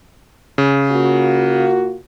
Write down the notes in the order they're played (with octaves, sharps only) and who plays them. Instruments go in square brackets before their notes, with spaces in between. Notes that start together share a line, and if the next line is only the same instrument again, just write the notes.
[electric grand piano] C#3
[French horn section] A#3 F4 F#4